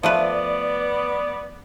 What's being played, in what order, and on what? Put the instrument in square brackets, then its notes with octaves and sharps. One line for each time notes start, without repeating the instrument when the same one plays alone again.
[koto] F3 A3 B4 [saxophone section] B3 D5